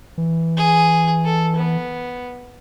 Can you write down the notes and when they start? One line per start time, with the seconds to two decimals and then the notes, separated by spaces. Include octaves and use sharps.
0.18 E3
0.57 G#4
1.25 A4
1.56 B3